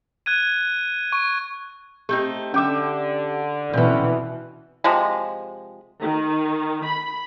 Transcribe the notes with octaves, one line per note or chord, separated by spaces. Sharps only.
F#6 G#6 D#7
C#6
A3 C4 D#4 G4
D3 C#4 G4 E5 G5 D6
B2 E3 C4 C#4
C3 F3 G#3
D#3
B5